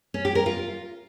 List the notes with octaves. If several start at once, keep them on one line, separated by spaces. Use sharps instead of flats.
C#4
G4
A#4
F4